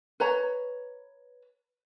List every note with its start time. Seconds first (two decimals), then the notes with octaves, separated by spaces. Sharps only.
0.20 B4 C#5 A#5